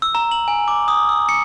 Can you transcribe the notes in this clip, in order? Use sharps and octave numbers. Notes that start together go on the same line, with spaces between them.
E6
A#5
F#7
G#5
D6
D#6
E6
C#7